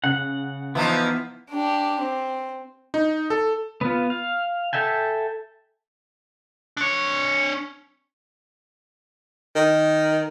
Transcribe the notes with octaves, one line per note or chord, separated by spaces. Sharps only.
C#3 F#5
E3 F3 B3 D#4 E4
D4 G4
C4
D#4
A4
B3 F4
F5
A4 E5 G5 G#5
D4 C#5
D#3